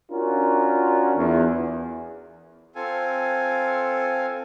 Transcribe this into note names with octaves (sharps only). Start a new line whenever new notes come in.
C#4 D4 F4 F#4 A#4
E2
C4 F4 A4 G#5